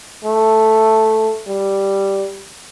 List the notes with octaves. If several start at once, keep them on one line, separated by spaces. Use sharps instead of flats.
A3
G3